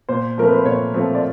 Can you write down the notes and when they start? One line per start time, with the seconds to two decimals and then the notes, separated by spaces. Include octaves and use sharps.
0.09 A#2 C5
0.38 F3 A3 C4 A#4
0.48 B4
0.56 C5
0.65 A#2 C#5
0.94 F3 A3 C4
1.15 D5